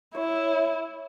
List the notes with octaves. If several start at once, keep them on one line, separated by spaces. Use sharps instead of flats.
E4 C#5